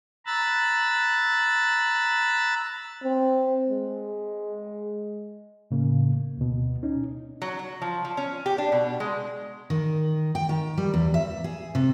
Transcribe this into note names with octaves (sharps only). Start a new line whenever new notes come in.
A#5 B5 E6 F#6 A6
C4
G#3
A2 C#3 A#3
D2 B2
C#4 D#4
F#3
F#3
F3
F3
C#4
G4
D4
B2
G#3
D#3
G5
D#3
G3
E2
E5
G#4
C3